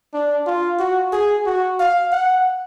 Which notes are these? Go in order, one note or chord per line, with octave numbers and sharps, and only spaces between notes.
D4
F4
F#4
G#4
F#4
F5
F#5